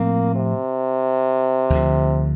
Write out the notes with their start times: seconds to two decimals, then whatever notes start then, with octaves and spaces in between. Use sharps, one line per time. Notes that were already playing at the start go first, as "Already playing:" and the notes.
Already playing: A2 F3 A#3 C4
0.35 C3
1.70 D2 D3 F3